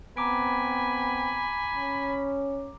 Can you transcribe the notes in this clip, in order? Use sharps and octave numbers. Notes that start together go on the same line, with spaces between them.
B3 C4 G#5 A#5 B5 D6 D7
C#4